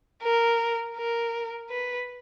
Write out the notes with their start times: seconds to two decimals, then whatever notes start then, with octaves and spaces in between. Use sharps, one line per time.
0.23 A#4
0.97 A#4
1.70 B4